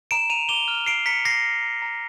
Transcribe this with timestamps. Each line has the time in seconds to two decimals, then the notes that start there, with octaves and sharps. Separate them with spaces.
0.11 A#5 D7 E7
0.30 A#5 D#7 F7
0.49 D6 F7 G7
0.68 F6
0.86 A#5 C7 D7
1.06 A#5 B6 C#7
1.25 D6 A#6 C7
1.44 F6
1.62 A#5
1.82 A#5